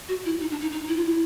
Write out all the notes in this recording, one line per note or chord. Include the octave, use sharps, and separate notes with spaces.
F#4
E4
D#4
D4
D#4
D#4
E4
F4
E4